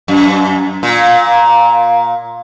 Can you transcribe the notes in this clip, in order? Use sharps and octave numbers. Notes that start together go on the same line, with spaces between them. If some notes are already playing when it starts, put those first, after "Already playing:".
F#2
A#2